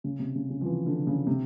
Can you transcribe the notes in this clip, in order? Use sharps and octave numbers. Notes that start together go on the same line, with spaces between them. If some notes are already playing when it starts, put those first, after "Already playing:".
C#3
C3
C#3
C#3
F3
E3
D3
C#3
C3